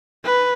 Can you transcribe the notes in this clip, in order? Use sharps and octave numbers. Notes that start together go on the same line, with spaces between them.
B4